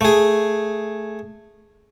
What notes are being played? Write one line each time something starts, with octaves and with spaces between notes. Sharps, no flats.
A3 G#4